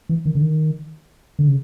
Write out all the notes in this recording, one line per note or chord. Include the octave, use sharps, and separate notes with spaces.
E3
D#3
D3
D#3
D3
C#3